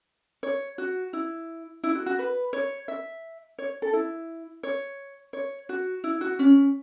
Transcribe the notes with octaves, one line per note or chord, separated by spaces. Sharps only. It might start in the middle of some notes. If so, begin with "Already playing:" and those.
C#5
F#4
E4
E4
F#4
F#4
B4
C#5
E5
C#5
A4
E4
C#5
C#5
F#4
E4
F#4
C#4